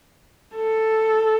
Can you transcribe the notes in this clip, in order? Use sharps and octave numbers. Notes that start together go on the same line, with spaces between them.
A4